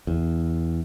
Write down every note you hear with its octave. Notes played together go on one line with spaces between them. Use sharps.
E2